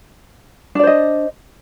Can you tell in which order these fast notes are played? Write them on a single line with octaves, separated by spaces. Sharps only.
D4 D5 C5 D#5